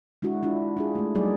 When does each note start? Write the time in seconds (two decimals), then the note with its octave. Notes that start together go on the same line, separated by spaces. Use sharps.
0.22 G#3 D4 E4 F#4
0.43 D4 E4 F4
0.77 D4 F4 G#4
0.95 G#3 A3
1.15 F#3 G3 A#3 D#4 G#4 D5